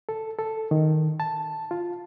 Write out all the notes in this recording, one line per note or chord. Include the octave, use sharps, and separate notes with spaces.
A4
A4
D#3
A5
F4